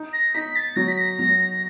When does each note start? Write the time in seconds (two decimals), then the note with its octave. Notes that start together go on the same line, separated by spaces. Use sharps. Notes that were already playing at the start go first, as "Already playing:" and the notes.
Already playing: D#4
0.13 A#6
0.34 D#4 B6
0.56 A6
0.76 F#3 A#6
0.88 B6
0.97 A#6
1.19 F#3 A#6
1.39 A#6